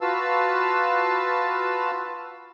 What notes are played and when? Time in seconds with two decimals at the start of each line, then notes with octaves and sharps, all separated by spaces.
0.01 F4 F#4 B4 F5 A5 E6